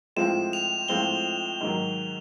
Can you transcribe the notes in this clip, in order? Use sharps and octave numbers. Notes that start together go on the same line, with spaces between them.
A2 F3 G#3 C4 F4 E7
F7
A2 F3 G#3 C4 F4 G7
G#2 D#3 F#3